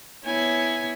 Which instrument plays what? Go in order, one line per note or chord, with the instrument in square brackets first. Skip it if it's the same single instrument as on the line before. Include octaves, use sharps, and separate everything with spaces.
[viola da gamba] B3 E4 C#5 [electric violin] G#5